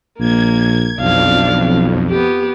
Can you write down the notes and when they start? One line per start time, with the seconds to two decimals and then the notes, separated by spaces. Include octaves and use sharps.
0.20 A#1 A#3 G#6
1.00 B1 F2 D4 F5
2.09 B3 G4